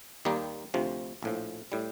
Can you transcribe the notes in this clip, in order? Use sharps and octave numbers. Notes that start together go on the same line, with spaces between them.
D#2 D#3 G3 A#3 D#4
D2 C3 F3
A#1 A2 F3
A2 G3